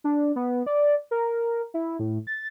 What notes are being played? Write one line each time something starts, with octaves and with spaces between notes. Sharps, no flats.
D4
B3
D5
A#4
E4
A2
A6